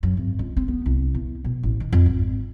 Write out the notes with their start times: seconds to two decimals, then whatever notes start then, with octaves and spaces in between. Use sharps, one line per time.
0.03 F#2
0.17 G#1
0.39 C#2
0.57 C4
0.68 B3
0.86 C2
1.14 E2
1.44 B2
1.63 A1
1.80 D#3
1.93 F2
2.06 G#1